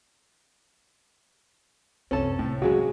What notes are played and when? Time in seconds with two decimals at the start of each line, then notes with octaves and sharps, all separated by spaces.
2.11 C2 F#2 C4 C#4 A4 A5
2.39 C2 A2
2.62 C#3 F#3 G#3 F#4 G#4